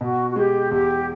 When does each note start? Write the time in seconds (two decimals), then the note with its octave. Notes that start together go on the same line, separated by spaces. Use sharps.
0.01 B2 F#4
0.29 F#4
0.36 G#3 G4
0.71 E2 G4